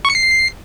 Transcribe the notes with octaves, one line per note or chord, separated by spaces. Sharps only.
C#6
C#7
C7